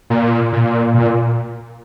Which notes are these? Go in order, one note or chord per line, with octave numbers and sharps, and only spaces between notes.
A#2
A#2
A#2